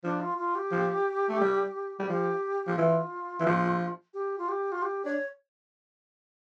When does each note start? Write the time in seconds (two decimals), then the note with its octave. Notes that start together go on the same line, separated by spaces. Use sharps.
0.04 F3 D4
0.21 F4
0.38 F4
0.55 G4
0.72 F3
1.29 A3
1.41 G3
1.99 G3
2.09 F3 G4
2.67 F3
2.77 E3 F4
3.40 E3
3.46 F3
4.14 G4
4.38 F4
4.48 G4
4.72 F4
4.82 G4
5.05 D4 C#5